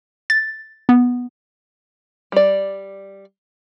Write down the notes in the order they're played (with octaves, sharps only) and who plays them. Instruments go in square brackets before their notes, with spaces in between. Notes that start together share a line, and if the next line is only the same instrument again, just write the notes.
[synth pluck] A6
B3
[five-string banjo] G3 D5